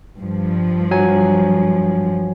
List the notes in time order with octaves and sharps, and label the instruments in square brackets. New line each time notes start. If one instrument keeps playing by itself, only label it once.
[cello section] G2 F3
[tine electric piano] F#3 G#5